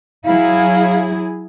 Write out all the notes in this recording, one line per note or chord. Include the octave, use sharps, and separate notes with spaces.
F#3 E4 G#4 F5